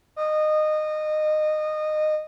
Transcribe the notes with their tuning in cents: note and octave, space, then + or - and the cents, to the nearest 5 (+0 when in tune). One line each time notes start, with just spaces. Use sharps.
D#5 -20